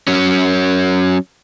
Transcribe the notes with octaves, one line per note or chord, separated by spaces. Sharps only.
F#3 C#4